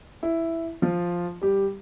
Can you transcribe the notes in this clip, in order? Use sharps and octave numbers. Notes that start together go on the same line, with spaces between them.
E4
F3 F4
G3 G4